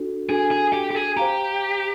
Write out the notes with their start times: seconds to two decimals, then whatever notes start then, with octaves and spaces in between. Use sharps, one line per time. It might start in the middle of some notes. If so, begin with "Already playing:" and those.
Already playing: D4 F#4 A4
0.29 D4 F#4 G#4 A4
0.51 G#4
0.73 G4
0.91 G4
0.95 G#4
1.17 G4 C5 F5 A#5